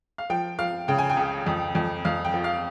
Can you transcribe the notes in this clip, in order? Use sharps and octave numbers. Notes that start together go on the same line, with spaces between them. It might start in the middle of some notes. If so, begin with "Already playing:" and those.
F5
F3 G5
F3 F5
C#3 G5
G#5
G5
C#2
F2
F2
F2 F5
G5
F3
F5